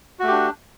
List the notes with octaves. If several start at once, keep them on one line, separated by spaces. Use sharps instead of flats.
A3 D4 F#4 G4